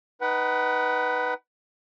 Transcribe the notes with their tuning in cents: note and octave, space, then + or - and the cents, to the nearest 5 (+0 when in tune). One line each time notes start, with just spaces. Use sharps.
D#4 +0 B4 +0 F#5 +35